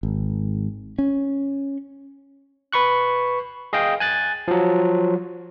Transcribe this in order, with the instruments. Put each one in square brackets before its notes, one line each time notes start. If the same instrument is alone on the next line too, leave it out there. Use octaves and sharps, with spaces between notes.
[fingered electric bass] G#1
C#4
[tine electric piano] B4 B5 C#6 F#6
G#4 D#5 F5 G5
G#5 F#6 A6
F3 F#3